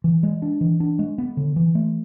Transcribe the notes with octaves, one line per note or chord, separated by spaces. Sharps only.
E3
G#3
D4
E3
D4
G#3
B3
D3
E3
A3